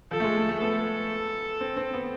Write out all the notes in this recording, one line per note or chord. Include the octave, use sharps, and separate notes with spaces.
F3 A4
A3
G#3
A3
A3
B3 A4
C4
C4
B3